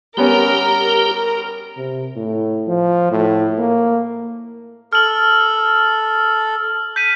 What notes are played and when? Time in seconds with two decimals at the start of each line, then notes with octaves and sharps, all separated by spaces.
0.17 G3 B3 C#4 G4 A#4
1.77 C3
2.16 A2
2.68 F3
3.11 A2
3.58 A#3
4.93 A4 F6 F#7
6.96 G6 B6 D#7